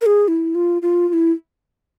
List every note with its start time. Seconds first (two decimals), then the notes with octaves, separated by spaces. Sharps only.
0.01 A#4
0.06 G#4
0.28 E4
0.55 F4
0.82 F4
1.09 F4
1.13 E4